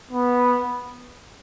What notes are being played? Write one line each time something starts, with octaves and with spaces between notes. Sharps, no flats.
B3